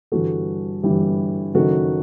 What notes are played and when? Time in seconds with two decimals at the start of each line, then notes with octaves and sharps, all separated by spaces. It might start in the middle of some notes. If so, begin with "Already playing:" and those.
0.12 G1 G2 E3 F#4 A4
0.83 G1 G2 E3 E4 G4
1.55 F#1 F#2 D#3 F#4 A4